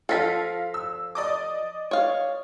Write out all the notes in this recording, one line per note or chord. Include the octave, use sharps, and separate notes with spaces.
F3 F#3 A4 F5 A#6 B6
E6
D5 D#5 D6
C#5 F5